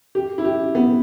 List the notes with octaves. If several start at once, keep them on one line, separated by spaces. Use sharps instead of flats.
G4
E4
G4
B3